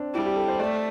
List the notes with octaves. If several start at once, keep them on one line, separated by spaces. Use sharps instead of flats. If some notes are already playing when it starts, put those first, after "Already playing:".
Already playing: C4 D4
G3 E4
G4
A4
C5
A3 D5